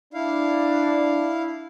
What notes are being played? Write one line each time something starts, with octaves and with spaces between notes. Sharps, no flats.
D4 E4 F5